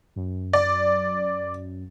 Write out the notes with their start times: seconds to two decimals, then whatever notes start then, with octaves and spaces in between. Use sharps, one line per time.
0.16 F#2
0.53 D5